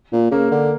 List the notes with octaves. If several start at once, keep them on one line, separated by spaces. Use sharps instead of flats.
A#2
C#3 A#3
D3